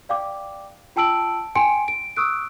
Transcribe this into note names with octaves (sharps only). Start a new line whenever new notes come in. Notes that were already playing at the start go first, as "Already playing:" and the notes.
D5 F5 G5 D6
F4 G5 A5 E6 D7 F#7
G5 G#5 C6 C#7 D7
D7
C#6 D#6 E6 F#6 D7